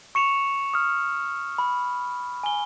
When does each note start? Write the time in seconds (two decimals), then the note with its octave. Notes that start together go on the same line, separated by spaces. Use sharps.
0.15 C#6 C#7 E7 F7
0.74 D#6 F6
1.58 B5
2.43 G#5 G7